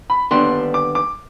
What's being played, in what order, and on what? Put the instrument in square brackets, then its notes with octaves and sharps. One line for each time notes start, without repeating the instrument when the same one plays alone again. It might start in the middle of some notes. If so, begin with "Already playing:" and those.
[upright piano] B5
[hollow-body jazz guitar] D#2 D3 G3 B3 D4 [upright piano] C6
[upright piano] D6
D6